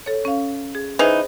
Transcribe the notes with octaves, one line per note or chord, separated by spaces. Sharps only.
A4 C#5
C#4 F5
G#4
E3 D#4 G#4 C5